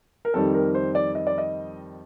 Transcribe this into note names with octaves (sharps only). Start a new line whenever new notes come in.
A#4
F2 D#3 G3 A4
A#4
C5
D5
D#5
D5
D#5